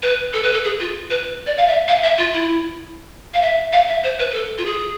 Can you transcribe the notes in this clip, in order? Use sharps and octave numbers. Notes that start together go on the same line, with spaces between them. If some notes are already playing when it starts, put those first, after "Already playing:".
B4
A4
B4
A4
G#4
F4
B4
D5
F5
E5
F5
E5
F4
E4
F5
E5
F5
E5
C5
B4
B4
A4
F4
G#4